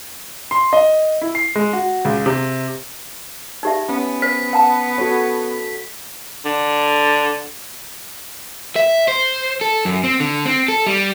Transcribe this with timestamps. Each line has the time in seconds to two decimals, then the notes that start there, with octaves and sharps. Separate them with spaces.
0.51 C6
0.73 D#5
1.22 E4
1.35 C7
1.56 G#3
1.73 F#4
2.05 C#2
2.26 C3
3.63 D#4 G4 E5
3.89 B3 C#4
4.22 C5 B6
4.53 F#5 A5 A#5
4.98 F#4 A4 C#5
6.45 D3
8.76 E5
9.08 C5
9.61 A4
9.85 F#2
10.04 C4
10.20 D3
10.45 C4
10.68 A4
10.87 G3